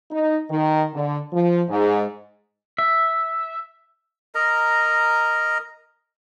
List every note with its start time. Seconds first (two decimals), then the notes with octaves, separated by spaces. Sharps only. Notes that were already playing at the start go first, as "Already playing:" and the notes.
0.11 D#4
0.50 D#3
0.94 D3
1.33 F3
1.69 G#2
2.78 E5
4.35 A#4 D#5 A#5